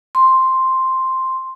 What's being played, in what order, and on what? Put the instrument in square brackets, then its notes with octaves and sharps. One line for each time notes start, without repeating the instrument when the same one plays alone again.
[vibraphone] C6